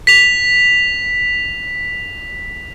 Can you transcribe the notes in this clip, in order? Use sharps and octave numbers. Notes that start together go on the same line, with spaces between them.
B6 F7